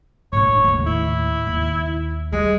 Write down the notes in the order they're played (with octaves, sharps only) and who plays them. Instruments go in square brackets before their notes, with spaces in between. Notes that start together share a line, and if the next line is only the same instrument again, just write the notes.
[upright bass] A2 D4 [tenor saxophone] C#5
[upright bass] D#2 A2
[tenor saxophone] E4
[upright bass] D#2
[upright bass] G3 [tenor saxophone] G#3